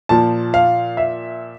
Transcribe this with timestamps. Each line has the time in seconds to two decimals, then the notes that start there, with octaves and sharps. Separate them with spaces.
0.09 A#2 F3 A5
0.54 F5
0.97 E5